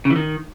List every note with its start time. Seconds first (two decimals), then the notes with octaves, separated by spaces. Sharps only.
0.05 C#3
0.11 E3
0.16 D#3